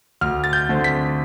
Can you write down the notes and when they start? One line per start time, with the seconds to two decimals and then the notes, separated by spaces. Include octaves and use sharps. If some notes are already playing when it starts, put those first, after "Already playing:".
0.21 D2 F6
0.44 A6
0.53 G6
0.69 D3 A3 C4
0.84 B6